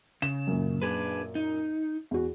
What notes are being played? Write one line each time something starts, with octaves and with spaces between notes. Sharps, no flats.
C#3 E7
F#2 A#2
D4 G#4 B4
D#4
E2 F#4